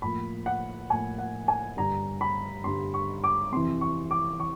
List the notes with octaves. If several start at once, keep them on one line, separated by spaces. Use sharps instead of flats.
A2 F3 A#3 B5
F#5
A2 F3 A#3 G#5
F#5
G#5
G2 D3 G3 A#5
B5
G2 D3 G3 C6
C#6
D6
F2 C3 E3 C6
C#6
D6
E3 C#6